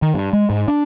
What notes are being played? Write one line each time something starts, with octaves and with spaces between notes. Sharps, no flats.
D#3
G2
G#3
G#2
D4